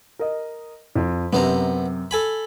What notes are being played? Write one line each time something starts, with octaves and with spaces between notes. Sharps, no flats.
A#4 D#5
F2
F#2 C3 B3 C5 A#5
A4 G#5 B5